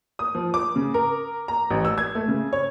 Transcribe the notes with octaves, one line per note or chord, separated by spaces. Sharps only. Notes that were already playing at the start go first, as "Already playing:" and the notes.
D#6
F3
D6
C#3
A#4
A#5
A1
E6
G#6
A3
C#3
C#5